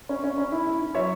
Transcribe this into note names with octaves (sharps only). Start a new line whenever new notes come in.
C#4
C#4
C#4
E4
E4
E4
F#3 C#5 E5